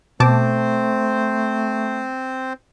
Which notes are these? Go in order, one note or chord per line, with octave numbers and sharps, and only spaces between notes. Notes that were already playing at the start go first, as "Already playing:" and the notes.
B2 A3 C4 C5 A5 D6